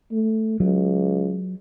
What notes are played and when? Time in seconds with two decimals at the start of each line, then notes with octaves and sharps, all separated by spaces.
0.12 A3
0.60 C#2 F#3